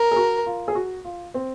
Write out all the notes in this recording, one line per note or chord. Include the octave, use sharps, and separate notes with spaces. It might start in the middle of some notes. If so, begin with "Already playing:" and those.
Already playing: A#4
G#4
F#4
F4
G#4
F#4
F4
C4